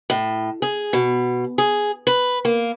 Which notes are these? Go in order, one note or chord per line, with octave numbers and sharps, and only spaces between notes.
A2
G#4
B2
G#4
B4
A#3